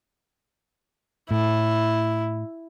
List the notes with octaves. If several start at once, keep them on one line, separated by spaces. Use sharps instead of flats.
A2 E4